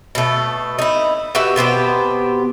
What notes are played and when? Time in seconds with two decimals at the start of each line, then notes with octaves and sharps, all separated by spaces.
0.15 B2 A3
0.79 D#4 E4
1.35 F#4 G4 B4 E5
1.56 B2 B3 C4 G4